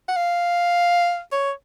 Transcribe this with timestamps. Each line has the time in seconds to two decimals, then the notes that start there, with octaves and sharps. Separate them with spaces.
0.08 F#5
0.16 F5
1.32 C#5